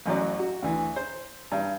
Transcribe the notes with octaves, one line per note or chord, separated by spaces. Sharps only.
A1 F#2 F#3 D5
F#4
D2 E3
C5
G2